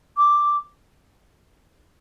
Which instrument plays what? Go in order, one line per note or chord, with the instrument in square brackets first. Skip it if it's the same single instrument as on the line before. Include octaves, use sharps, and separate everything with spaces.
[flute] D6